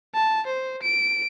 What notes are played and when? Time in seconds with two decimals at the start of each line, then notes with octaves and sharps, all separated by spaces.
0.15 A5
0.47 C5
0.83 D7